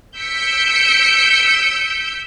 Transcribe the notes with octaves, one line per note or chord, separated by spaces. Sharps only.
E6 G6 B6 C#7 D7